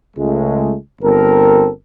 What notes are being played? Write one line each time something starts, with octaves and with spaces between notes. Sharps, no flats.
C#2 G#3 A3
G1 C4 A4 A#4